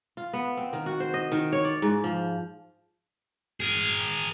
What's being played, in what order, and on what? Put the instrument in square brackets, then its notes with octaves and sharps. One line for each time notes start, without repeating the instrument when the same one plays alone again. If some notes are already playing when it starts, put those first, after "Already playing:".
[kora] F4
B3
C4
D#3
F#4
C5
D#5
D#3
C#5
D5
G#2
F3
[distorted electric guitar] G#4 A#4